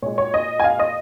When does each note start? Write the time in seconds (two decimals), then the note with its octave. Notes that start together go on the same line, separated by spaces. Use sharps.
0.02 A#2 G#3 C#5
0.18 C#5
0.34 D#5
0.60 G#5
0.64 F5
0.79 D#5